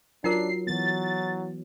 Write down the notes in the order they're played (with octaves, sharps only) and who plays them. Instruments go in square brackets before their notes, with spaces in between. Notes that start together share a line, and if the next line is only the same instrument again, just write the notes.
[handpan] F#3 [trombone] D4 [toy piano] D#4 F4 A#4 [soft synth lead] C7
[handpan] E3 B3 [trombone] F#3 [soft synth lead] A6